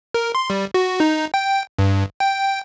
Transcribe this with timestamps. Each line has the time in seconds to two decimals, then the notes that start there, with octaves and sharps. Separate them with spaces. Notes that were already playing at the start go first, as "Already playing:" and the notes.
0.14 A#4
0.35 C6
0.50 G3
0.74 F#4
1.00 D#4
1.34 G5
1.78 G2
2.20 G5